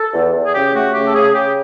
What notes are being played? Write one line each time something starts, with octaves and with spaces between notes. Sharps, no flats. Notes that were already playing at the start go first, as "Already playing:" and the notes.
Already playing: A4
E2
E2
G#4
C#3 G4
A3 F#4
C#3 G4
A4
C#3 G#4
C#3 G4